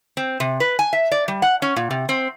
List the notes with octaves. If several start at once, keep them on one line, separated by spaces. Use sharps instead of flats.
C4
C3
B4
G#5
E5
D5
G3
F#5
C#4
A#2
C3
C4